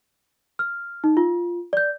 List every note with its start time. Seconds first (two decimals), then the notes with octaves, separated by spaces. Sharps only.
0.59 F6
1.04 D#4
1.17 F4
1.73 D5 G6